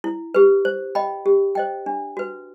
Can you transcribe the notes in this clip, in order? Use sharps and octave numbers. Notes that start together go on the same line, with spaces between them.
E4
G4 B4
C5
D#5 G5 B5
G4
C5 D#5 G5
D4
F#4 B4